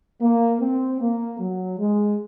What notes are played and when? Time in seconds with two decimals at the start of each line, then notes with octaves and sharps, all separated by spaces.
0.22 A#3
0.61 C4
1.01 A#3
1.40 F#3
1.79 G#3